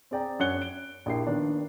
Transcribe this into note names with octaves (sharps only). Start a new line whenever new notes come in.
C4 G#4 D5 G5 A#5
F#2 C#5 F#5 F#6 C#7 G7
D7 G7
A#1 A#3 E4 G4 G5 C7
D#3 A#3 B3 D4